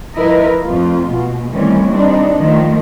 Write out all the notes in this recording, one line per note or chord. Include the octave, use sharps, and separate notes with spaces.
F3 E4 A#4 B4 D#5
F2 A3 F4
B2
D#3 E3 G3 A3 C4 C#4
G3 C4 D4 D#4
D#3 F3 A3